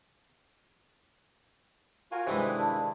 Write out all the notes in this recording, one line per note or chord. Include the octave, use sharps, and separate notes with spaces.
F4 F#4 A#4 G#5
C3 D#3 E3 G#3 D4 E4 D#6
G2 A5